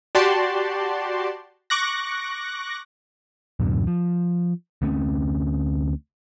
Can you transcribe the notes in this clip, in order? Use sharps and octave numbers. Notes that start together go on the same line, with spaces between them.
F#4 G4 D5 A5 C6
C#6 D6 F#6 A#6
D1 F#2 B2 D3
F3
D2 A3 C4 C#4